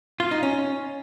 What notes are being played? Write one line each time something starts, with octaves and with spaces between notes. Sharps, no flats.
F4
D#4
C#4